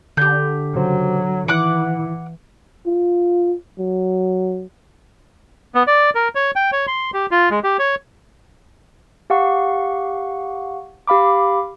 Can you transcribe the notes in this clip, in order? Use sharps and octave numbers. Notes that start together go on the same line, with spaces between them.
D3 G4 G6
C#3 F#3 F#4 C5
D#3 E3 E4 F#5 D6 F#6
F4
F#3
B3
D5
A#4
C#5
G5
C#5
C6
G4
F4
G#3
G4
C#5
G4 F5 F#5 C#6
G4 F5 B5 D6